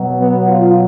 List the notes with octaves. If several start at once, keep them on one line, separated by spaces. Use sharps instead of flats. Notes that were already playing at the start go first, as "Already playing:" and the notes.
Already playing: B2 F#3
B3
F4